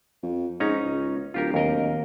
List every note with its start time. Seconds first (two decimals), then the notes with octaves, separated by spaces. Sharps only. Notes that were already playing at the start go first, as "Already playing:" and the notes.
0.23 F2
0.60 G#2 C#4 D#4 A#5
0.84 C#2
1.34 D1 F4 G4 A#4
1.54 D#2 A#4 D#5